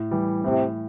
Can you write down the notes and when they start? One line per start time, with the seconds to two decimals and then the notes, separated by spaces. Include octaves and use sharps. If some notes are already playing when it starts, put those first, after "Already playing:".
Already playing: A2
0.11 E3 G3
0.44 A2 C3